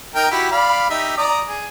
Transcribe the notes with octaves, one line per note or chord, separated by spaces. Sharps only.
D#4 A#4 G5
E4 F#4 G4
D5 F5 B5
D#4 G4 E5
D5 A#5 D#6
G#4